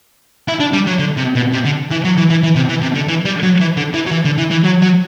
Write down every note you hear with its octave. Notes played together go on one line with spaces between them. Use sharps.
E4
D4
G3
F#3
D3
C3
B2
C3
D3
E3
F#3
E3
E3
E3
C3
E3
C3
D3
E3
G3
F#3
E3
D3
E3
F#3
E3
D3
E3
E3
F#3
F#3